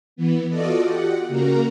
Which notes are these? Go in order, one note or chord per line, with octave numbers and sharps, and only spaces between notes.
E3 B3
F4 F#4 A4 D5 D#5
G4 F#5
C#3 A#3 F#4 A#4 A#5